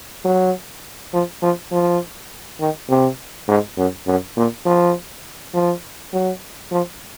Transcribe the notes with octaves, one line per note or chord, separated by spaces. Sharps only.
F#3
F3
F3
F3
D#3
C3
G#2
F#2
F#2
A#2
F3
F3
F#3
F3